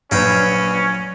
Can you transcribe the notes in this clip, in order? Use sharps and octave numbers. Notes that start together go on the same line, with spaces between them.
A#1 F#3 C#4 B4 F5 G5